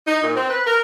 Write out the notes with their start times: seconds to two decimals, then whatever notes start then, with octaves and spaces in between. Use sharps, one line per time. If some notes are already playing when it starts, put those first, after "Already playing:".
0.07 D#4
0.23 A#2
0.36 C4
0.50 B4
0.67 A#4